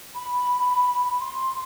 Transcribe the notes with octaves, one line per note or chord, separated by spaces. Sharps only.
B5
C6